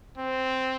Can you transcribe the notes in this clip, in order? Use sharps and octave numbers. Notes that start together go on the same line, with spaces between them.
C4